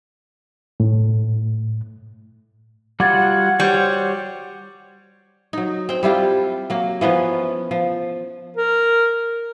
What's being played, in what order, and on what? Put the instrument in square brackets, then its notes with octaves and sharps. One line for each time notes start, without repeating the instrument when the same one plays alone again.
[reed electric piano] A2
[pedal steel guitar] G3 F4 F#4 [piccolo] F#5 [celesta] D6 G#6 A6
[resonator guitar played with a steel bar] G3 [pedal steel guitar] F#4 C5 C#5
[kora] F#3 D#4
C4 G5
G3 E4 F4 G4
F#3 A#3
E3 F3 B3 C#4
F3
[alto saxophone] A#4